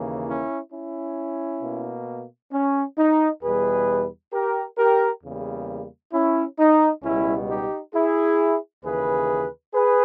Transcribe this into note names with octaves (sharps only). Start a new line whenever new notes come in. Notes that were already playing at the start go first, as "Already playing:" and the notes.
Already playing: D#2 C#3 E3 A#3
C#4 E4
C#4 E4
B2 A#3
C#4
D#4
E2 B2 G3 G#4 B4
G4 A#4
G4 A#4
E2 C#3 G3 A#3
C#4 E4
D#4
C#2 B2 G3 C#4 E4
D#4 G4
E4 G#4
D#2 C#3 E3 G#4 B4
G#4 B4